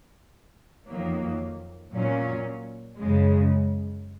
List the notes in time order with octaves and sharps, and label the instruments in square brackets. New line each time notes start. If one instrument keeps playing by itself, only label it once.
[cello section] F2 D#3 F#3 A#3
A#2 F#3 C#4
F#2 C#3 G#3